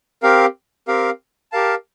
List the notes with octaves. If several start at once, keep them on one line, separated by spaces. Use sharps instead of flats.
C4 G4 A#4 F5
C4 G4 A#4 F5
G4 A#4 F5 A5